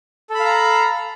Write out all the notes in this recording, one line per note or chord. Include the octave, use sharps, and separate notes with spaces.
A4 F5 A#5 B5